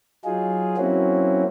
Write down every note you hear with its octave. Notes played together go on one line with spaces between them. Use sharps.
F#3 D#4 F4 G#4
F#3 A#3 C4 C#4 E4 F#4